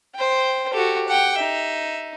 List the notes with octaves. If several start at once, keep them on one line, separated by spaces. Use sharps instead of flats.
C5 G5
F#4 G4 A4
F#5 G5
D#4 E5